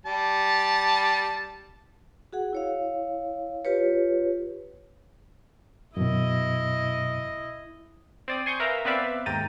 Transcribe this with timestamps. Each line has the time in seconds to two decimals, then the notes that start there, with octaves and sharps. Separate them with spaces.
0.06 G3 A5
2.33 F#4 G#4 F#5
2.53 E4 C#5 F5
3.65 F4 G4 B4 C#5
5.97 F#2 B2 E4 D#5
8.28 C4 D5 D#6
8.46 G#5 C6 C#6 D#6 G6
8.60 A#4 B4 E5 F5 A#5
8.85 B3 C4 B4 D5 E5 F5
9.26 D#2 G#2 G5 A#5 A6 D#7